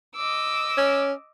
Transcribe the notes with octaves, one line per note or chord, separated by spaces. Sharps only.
D#5 D6 E6
C#4